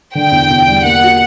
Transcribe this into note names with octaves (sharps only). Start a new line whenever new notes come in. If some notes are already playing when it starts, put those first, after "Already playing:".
D3 G5
E2
E2
G3
A#3 F#5
F#4